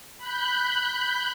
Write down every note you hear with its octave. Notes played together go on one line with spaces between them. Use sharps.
B5 F#6 G6